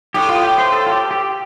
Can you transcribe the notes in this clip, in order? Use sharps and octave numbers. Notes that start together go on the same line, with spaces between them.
A2 G4
F4
G4
C5
A4
F4
G4
G4